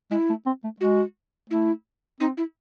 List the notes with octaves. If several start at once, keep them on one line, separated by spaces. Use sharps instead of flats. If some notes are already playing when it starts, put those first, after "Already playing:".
G#3 E4
A3
C4
A3
G#3 F#4
A3 E4
C4 D#4
E4